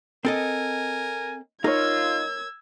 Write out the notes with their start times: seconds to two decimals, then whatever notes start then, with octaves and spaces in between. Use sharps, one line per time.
0.25 C4 A4 A#4 D#5 G#5
1.64 D#4 F4 A#4 C#5 E6 G#6